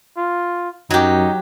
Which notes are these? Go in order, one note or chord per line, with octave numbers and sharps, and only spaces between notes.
F4
F#2 F#3 D#4 G4